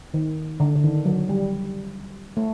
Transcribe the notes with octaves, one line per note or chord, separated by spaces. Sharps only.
D#3
D3
D3
D#3
F#3
G3
A3